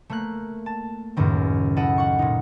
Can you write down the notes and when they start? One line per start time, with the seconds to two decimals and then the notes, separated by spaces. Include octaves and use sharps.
0.09 A3 A#3 F#6
0.66 A5
1.16 C#2 F#2 A2 D#3
1.76 E4 A4 D#5 F#5
1.98 F#5 C#6
2.19 A#2 D#4